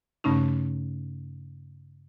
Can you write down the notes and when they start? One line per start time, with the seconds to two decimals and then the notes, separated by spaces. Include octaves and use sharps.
0.24 G2 C#3 A3 C#4 D#4